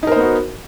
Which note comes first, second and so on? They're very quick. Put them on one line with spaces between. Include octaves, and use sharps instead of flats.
D#4 A#4 C5 B3 F#4